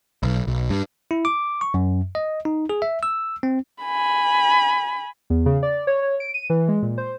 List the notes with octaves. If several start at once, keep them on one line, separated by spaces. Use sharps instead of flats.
B1
B1
G2
E4
D6
C#6
F#2
D#5
D#4
G#4
E5
E6
C4
G#5 B5
E2
C#3
D5
C#5
C#5
D7
D#7
E3
G#3
A#2
C5